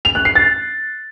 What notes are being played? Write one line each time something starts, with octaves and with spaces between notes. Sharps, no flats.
F7
F#6
C7
A6